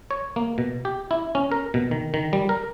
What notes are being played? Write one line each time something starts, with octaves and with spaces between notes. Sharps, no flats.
C#5
A#3
B2
G4
E4
C#4
A#4
B2
D#3
D#3
G3
A#4